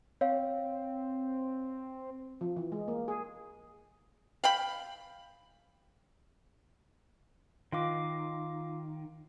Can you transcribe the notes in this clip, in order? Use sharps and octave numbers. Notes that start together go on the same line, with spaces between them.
C4 C#5 F5
F3
E3
G#3
A#3
G#4
F5 G5 B5
D#3 F4 F5 D6